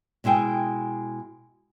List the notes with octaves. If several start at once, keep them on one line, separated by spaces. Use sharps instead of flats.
B2 G#3 E4 G#4 G5